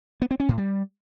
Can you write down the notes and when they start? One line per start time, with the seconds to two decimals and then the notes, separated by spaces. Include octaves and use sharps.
0.22 B3
0.31 C4
0.40 C#4
0.49 A2
0.58 G3